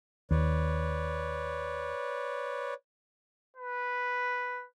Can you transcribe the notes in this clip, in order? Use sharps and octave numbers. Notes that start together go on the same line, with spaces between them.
D#2 B4 C#5 D5
B4